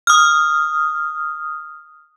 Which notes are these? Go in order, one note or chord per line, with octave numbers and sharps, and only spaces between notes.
D#6 F6